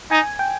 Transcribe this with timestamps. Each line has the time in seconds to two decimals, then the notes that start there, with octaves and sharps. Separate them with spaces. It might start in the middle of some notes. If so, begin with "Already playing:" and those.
0.11 D#4 G#5
0.39 G5